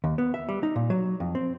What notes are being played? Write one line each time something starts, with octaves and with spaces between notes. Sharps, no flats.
D#2
B3
E5
G3
D#4
A#2
F#3
F2
C4